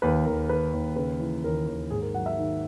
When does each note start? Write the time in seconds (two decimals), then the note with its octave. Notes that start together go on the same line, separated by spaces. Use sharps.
0.02 D#2 B4
0.26 D#2 A#4
0.49 D#3 B4
0.73 D#2
0.96 C#3 B4
1.20 E3
1.44 D#2 A#4
1.68 D#2
1.90 G#2 G#4
2.02 A#4
2.14 F#3 F#5
2.26 E5
2.38 D#3